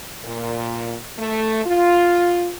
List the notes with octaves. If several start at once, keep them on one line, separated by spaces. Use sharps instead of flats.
A#2
A3
F4